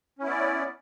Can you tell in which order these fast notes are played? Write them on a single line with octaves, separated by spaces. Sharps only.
C#4 E4 B3 D5